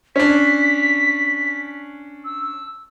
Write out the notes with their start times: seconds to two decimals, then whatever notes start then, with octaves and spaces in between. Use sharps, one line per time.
0.16 C#4 D4 B6
2.25 E6